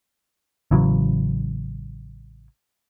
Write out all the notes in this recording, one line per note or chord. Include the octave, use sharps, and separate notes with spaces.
A1 C#3 E3 F#3